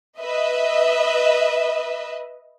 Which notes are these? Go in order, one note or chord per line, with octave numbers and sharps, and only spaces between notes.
B4 D#5 E5